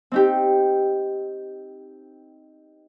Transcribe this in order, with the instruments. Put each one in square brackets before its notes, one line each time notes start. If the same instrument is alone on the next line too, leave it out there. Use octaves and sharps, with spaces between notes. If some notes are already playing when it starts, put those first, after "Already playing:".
[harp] C4 D#4 G4